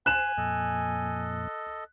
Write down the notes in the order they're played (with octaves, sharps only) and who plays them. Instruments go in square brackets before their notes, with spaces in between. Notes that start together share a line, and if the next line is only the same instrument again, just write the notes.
[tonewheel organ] C5 [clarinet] G#5 [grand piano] F#6 E7
[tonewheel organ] F2 A#2 [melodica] A4 D#5